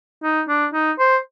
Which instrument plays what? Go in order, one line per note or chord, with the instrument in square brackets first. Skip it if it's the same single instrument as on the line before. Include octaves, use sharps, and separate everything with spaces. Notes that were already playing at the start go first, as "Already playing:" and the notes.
[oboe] D#4
D4
D#4
C5